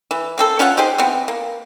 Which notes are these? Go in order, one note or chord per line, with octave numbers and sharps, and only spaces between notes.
E3
A#3 C4 A4
C#4 F4 C#5 F#5
D#4 G4 G#4 C5
E3 B3 C4
A#3